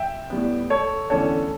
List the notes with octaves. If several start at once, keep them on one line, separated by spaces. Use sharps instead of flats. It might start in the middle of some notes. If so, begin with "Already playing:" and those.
Already playing: E5 G5
A2 G3 B3
A4 C#5
E2 D3 A3 C#4 A4 C#5